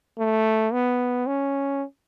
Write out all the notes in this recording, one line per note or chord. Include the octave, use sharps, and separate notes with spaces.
A3
B3
C#4